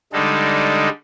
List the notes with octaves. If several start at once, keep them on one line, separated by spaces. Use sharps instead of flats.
D3 G3 G#3 D#4 A4